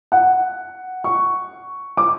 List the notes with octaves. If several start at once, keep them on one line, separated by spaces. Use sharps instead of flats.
F#5
C#6
D6